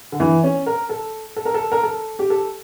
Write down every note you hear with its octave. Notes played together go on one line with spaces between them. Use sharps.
D3
E3
C#4
A#4
A4
A4
A#4
A4
A#4
A4
G4
A4